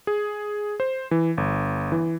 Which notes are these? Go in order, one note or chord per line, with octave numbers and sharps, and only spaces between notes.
G#4
C5
E3
G1
E3